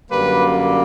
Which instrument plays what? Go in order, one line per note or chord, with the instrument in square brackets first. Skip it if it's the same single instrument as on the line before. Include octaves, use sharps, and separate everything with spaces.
[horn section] F#2 D3 G3 A#3 B4